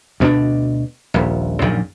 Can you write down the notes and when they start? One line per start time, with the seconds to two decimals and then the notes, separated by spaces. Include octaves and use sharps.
0.20 D2 B2 B3 D4
1.14 D#1 A#1
1.62 A#1 F#2 A#2 D#3